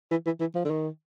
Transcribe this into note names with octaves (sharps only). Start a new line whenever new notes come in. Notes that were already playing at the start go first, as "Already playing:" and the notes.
E3
E3
E3
F3
D3
D#3